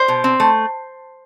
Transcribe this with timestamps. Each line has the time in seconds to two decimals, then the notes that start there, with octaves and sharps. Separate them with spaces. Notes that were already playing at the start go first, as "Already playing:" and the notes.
Already playing: C5
0.08 B2
0.24 C4
0.40 A3